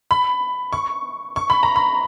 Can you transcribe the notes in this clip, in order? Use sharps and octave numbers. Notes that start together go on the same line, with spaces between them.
B5
C#6
C#6
B5
A#5
B5